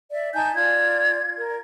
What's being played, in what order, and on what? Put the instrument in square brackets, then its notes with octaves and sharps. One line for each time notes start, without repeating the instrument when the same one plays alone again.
[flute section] D5 E5
D#4 G#5 A5 G6
F4 D5 G#6
A#4